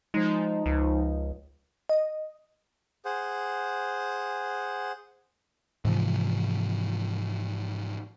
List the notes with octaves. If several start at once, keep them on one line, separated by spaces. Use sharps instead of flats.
F3 G#3 D#4
C#2
D#5
G#4 C5 F#5
G#2 C3 E3 F3